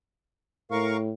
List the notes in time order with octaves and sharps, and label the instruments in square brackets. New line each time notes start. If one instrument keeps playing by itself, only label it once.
[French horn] A2 [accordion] A#4 F5 C#6